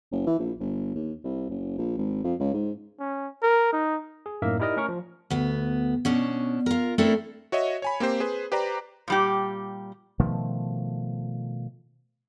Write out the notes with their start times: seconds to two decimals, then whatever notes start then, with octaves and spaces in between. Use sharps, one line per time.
0.12 F#1
0.27 E3
0.39 A#1
0.60 G1
0.95 D#2
1.24 C2
1.50 F#1
1.78 A#1
1.97 G#1
2.24 F2
2.40 C#2
2.54 G#2
3.00 C#4
3.42 A#4
3.73 D#4
4.26 G#4
4.42 F#2 A2 A#3 D#4 A#4 E5
4.60 D#4 E4 G4 A#4 D5 D#5
4.76 A3 C#4 A#4 C#6
4.89 F3
5.30 D2 B3
6.05 B2 C#4 D4
6.66 F4 A#4
6.98 A3 C4 D4 E4 A4 A#4
7.52 F#4 C#5 D#5 E5
7.82 C#5 G#5 B5
8.00 A#3 C4 G4 C5
8.20 G#4 B4 C5
8.52 G4 B4 C5 D5 A#5
9.08 A#2 G3 G4
10.20 B2 D#3 F3 A3